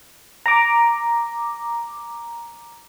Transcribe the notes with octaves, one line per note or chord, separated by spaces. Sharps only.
A#5 D6